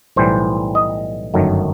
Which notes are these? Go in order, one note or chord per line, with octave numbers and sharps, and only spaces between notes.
B1 A2 E3 G3 C5
D#5
G1 F#2 D#3 F#3 A3